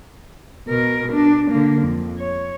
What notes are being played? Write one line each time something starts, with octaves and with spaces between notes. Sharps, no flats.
B2 A#4
D4
D3 A#3
F2
C#5